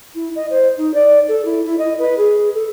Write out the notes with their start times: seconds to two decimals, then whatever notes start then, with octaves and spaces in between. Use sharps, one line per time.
0.15 E4
0.36 D#5
0.50 C5
0.77 D#4
0.94 D5
1.28 A4
1.45 E4
1.65 E4
1.79 D#5
1.99 B4
2.18 G#4
2.54 A4